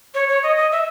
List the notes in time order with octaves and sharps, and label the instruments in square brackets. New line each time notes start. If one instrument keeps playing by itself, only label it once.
[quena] C#5
C#5
D#5
D#5
E5